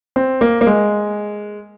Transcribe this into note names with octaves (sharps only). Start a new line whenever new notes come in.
C4
A#3
A#3
G#3